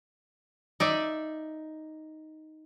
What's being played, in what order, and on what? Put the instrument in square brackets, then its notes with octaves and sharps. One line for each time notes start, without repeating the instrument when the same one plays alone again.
[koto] D#4 D5 E5